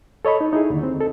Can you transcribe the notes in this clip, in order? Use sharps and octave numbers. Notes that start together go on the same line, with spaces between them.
A4 C#5 D#5 B5
D#4
D#4 E4 G#4
D#2 D3
C4
D2 A4